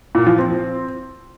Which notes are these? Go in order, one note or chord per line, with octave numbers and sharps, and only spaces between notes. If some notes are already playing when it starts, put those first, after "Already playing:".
A#2
F3
C4